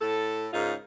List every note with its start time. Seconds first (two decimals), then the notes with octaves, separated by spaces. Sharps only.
0.01 A2 A4
0.53 G#2 C#3 D#4 F4 A#4